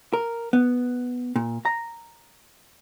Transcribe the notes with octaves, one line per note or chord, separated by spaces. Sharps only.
A#4
B3
A#2
A#5